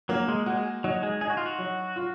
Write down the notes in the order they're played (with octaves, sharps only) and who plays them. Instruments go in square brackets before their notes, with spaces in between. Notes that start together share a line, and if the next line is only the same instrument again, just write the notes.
[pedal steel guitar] F#3 [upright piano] A#3
[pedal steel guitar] G#3
[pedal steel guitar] G#3 [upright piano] F#4
[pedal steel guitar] F#3 [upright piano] D#4
[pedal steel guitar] G#3
[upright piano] D#4 [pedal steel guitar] G#4
[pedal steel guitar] F#4
F4
F#4
[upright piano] F#3
F4